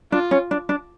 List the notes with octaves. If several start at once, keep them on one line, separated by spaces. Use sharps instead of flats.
D4 F4
C#4
D4
D4